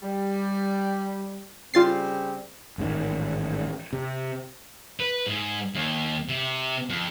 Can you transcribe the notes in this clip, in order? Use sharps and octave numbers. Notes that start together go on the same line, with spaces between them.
G3
C#3 G3 C4 F4 A6 C7
A1 G#2 C3 D#3
C3
B4
G#2
D#2
C3
F2